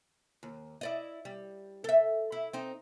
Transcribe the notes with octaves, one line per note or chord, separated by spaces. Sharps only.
D#2
E4 D5 D#5
G3
A4 E5
E4
C4 D#4